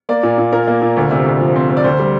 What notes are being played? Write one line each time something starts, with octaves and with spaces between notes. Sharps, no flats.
A#3 D5
A#2
A#2
A#2 A#4
A#3
A#2
D2
C3
D2
F3
C4
C4
D5
D2 C5
G3